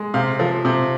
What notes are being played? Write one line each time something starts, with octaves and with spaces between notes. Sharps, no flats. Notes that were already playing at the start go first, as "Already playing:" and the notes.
Already playing: G#3
C3 F5
F3
C3